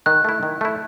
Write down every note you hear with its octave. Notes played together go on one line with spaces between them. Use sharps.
D#3 F#6
A3 E4
D#3
A3 E4